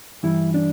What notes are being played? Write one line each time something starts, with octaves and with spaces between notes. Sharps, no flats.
G2 E3 G3 E4
D4